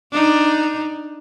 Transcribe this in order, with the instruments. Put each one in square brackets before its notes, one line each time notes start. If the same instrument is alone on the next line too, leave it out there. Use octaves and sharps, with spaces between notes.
[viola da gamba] D4 D#4